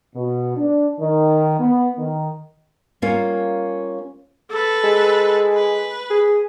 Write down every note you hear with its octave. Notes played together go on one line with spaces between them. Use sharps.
B2
D4
D#3
B3
D#3
G3 A#3 C#4 F4 A#4 C#5
A4 B4
G#3
B4
G#4